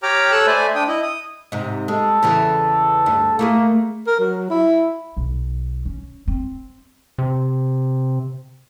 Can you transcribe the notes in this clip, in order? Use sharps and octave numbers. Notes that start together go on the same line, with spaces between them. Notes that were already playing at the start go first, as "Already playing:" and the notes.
G4 C#5 G5 A#5 D6 F6
A4 C#5 E6 F#6
A3 C5 D5 G#5 B5
D4 G5 D#6
E4 D#5
D#6
G#2 C3
G#3 A4
E2 C#3 E3
D2 G2
A3 A#3 E4 G#4
A#4
F#3
E4
B1
C#4
C4
C3